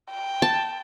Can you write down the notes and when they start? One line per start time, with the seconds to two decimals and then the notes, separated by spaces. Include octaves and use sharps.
0.11 G5
0.42 A5